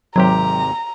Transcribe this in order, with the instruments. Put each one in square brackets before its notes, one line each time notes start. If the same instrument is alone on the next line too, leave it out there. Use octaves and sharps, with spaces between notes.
[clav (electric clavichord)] G#1 C3 G4 [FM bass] F#3 [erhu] A#5